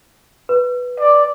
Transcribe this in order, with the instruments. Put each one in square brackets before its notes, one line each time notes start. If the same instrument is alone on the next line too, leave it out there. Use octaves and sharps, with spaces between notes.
[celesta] B4
[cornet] D5